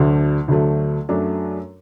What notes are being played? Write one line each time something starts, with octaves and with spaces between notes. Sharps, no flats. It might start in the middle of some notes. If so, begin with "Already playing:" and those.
Already playing: D2 D3 F#3 A3
D2 D3 F#3 A3
F#2 F#3 A3 D4